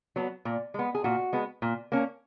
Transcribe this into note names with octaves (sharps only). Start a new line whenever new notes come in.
F#3 B3
A#2
G#3 B3
G#4
A#2 F#4
G#3 B3
A#2
A#3 C#4